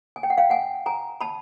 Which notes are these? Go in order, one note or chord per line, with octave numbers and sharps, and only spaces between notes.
G#5
G5
F#5
F5 G5
F#5 G#5
G#5 A#5
A5 B5